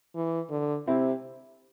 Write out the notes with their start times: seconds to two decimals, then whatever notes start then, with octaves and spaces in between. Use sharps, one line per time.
0.15 E3
0.50 D3
0.87 C3 C4 E4